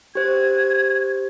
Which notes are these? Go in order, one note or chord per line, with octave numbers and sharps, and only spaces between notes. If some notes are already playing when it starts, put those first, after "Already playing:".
G4 C5 G#6